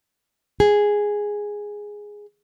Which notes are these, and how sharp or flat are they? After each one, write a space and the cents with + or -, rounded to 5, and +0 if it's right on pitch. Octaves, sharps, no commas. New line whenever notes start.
G#4 -5